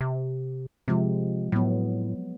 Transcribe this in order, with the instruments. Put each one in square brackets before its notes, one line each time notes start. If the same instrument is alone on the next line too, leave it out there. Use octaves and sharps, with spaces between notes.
[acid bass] C3
[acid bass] C3 [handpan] F3 G#3 C4
[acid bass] A2 [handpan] F#3 B3